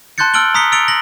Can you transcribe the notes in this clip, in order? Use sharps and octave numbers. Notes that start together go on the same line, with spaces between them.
A5 C6 F#6 G6 A6 C#7
A5 E6 F6 D7 F#7 G7
A#5 D#6 B6 C#7 G7
E6 A6 C#7 D7 F7 G7
A#6 F#7